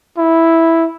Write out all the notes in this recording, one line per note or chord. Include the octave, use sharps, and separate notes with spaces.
E4